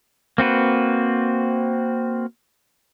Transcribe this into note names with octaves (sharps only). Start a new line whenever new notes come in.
A#3 C4 F#4 B4